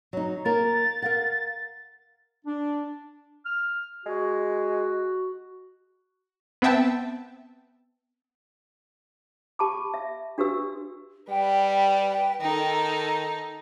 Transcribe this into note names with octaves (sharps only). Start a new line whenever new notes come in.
F#3 D#4
A#3 A#4 A6
A#4 F5 F#5
D4
F6
G#3 F#4
B3 C4 B4 E5 G5 A5
G4 A5 B5 D6
E5
D4 F#4 G4 B4 E6
G3 B4 G5
D#3 D#4 A4